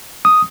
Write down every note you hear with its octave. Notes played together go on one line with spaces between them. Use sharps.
D#6